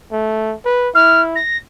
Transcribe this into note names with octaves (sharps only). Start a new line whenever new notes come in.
A3
B4
E4 F6
A#6